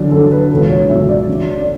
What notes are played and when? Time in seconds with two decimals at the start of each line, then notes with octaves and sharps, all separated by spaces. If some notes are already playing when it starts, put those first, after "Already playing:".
Already playing: F#2 D3 F#3 D4
0.12 F#2 D3 F#3 A4
0.31 B4
0.51 C#2 B2 F#3 A4
0.70 C#5
0.89 C#2 B2 F#3 E5
1.09 D5
1.28 F#2 C#3 F#3
1.61 D5